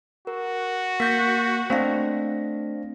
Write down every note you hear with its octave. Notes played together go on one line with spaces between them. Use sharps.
F#4 A#4
A#3 G6 B6
A3 C4 D4 F5 A#6